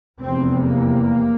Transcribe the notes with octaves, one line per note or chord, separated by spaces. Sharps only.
F1 E2 C3 C4
A#3